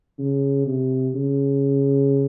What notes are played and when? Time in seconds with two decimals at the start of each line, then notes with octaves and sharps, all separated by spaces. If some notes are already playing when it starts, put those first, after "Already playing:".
0.19 C#3
0.66 C3
1.15 C#3